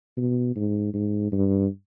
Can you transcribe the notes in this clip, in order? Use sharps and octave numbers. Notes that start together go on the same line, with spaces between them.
B2
G#2
G#2
G2